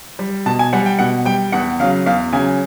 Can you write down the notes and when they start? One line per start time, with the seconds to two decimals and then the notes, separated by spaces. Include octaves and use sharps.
0.19 G3
0.46 B2 A5
0.59 G#5
0.73 G3 F#5
0.86 G5
0.99 B2 F#5
1.26 G3 G5
1.52 E2 F#5
1.80 C#3 F#3 F5
2.06 E2 F5
2.33 C#3 F#3 G#5